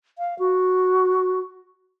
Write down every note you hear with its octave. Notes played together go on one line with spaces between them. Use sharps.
F5
F#4